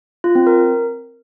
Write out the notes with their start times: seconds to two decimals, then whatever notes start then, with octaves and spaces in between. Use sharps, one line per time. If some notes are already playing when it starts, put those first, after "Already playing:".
0.24 F4
0.35 C4
0.47 A#4